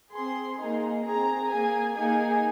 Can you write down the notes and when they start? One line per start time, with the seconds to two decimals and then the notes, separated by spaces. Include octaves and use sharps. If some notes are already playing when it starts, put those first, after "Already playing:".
0.12 C4 G#4 C6
0.57 A#3 D#4 G#4
1.04 C4 G#4 A#5
1.50 A#3 G#4 G#5
1.96 A#3 D#4 G#4 G#5